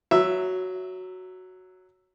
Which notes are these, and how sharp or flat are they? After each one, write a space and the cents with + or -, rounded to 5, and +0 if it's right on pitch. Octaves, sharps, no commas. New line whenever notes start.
F#3 +0 E5 +0